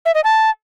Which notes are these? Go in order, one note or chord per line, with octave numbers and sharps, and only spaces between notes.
E5
D#5
A5